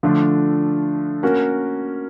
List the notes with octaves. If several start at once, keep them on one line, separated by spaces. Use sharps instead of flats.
D3 F3 A3 D4 F4
A#3 C#4 F#4 A#4